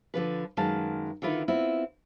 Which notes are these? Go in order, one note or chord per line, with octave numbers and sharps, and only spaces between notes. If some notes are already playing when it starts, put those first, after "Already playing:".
D3 F3 B4
F#2 D#3 G#3 B4 F5 A5
D3 D#3 E4 F4 B4
B3 C4 E4 F4